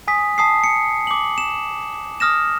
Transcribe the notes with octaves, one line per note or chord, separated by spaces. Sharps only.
G#5 D#6 B6
A5 D#6 C7
C#7
D6 F#7
E7
D#6 F6 A#6 E7